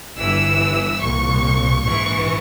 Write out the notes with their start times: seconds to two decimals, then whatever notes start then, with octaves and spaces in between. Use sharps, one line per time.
0.18 G1 G2 E3 E6
1.01 C2 A#2 C#6
1.85 A#1 G#2 E3 C#6